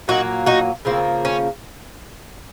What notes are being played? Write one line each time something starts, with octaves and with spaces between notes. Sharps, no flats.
A#2 F#3 A#3 D#4 F#4
D#4 F#4
C#3 F3 A#3 C4
C#4